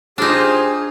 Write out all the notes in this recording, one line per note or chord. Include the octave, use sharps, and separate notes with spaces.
D4 D#4 F4 G4 G#4 C5